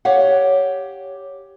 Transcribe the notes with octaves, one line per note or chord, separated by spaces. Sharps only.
G4 C#5 F5 F#5